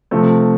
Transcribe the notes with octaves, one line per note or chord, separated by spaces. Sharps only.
C3 F3 A3 C4